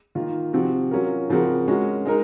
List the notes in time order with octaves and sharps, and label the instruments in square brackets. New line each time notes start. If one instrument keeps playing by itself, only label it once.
[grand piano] D#3 A#3 F4 A#4
C3 F3 C4 F#4
F#3 C#4 F4 A#4
C#3 F3 C4 F#4 A#4
G#3 C#4 F#4 A#4
G#3 D#4 A#4